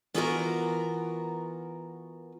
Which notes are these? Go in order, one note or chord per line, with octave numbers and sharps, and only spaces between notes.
E3 B3 F4 F#4 A#4 A#5